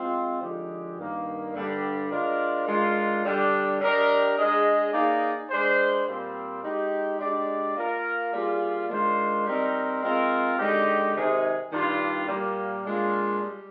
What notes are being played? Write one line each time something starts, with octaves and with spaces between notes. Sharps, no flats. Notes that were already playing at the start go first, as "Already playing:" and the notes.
Already playing: G#3 C4 F4
D3 F3 G#3 D#4 G4
G2 D#3 A#3
G2 D3 G3 D4
G#3 D4 F4 A#4 D5
D#3 G#3 D4 F4
D3 G3 D4 G4
G3 D4 G4 A#4 D#5
G#3 D4 G#4 D#5
A#3 D#4 G#4 D5
G#3 D4 G#4 C5
A#2 G3 C4
G#3 D#4 G4
G#3 D4 G4 D5
A#3 F4 A#4
G3 A#3 F4 G#4 D5
D#3 G#3 D4 F4 C5
G3 C4 D#4 A#4
G#3 C4 F4 A#4
D3 G#3 D#4 G4
C3 D#3 G#3 D#4 G#4
G2 D#3 G3 D4 F4
A#2 G3 A#3
A#2 G#3 D4 F4
G3